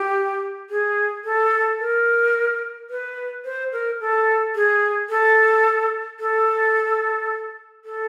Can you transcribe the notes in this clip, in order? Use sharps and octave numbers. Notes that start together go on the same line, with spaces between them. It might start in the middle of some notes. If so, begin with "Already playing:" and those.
Already playing: G4
G#4
A4
A#4
B4
C5
A#4
A4
G#4
A4
A4
A4